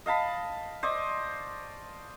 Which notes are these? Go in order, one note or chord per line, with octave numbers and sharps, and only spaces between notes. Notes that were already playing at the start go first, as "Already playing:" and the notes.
D#5 F5 A5 B5
C5 D5 D#5 C#6